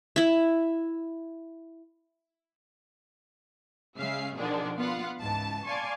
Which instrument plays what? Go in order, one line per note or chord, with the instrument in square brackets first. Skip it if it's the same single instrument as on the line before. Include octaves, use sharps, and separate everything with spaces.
[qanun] E4 E5
[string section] C#3 G#3 G#4 E5 F5 C7
B2 D3 D#3 F3 D4 G#4
B3 F4 F5 F#5
C#2 G#2 E3 A5
D5 F5 G#5 A5 C6 C#6